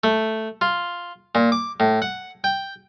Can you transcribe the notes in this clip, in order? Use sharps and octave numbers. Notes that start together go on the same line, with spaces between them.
A3
F4
A#2
D6
A2
F#5
G5